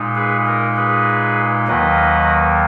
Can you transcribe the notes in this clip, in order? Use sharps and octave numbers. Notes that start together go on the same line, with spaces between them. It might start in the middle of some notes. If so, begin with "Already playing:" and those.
Already playing: A#2 G#3 D#4
G#4 B4
A#4
G#4 B4
D#2 D#3 F#3 A#3 B4 D#5